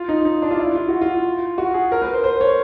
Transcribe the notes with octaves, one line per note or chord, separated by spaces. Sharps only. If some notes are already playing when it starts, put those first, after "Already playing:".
Already playing: F4
D#4
D#4
D4
F4
E4
F4
F#4
F4
F#4
G#4
A#4
B4
C5
C5
C#5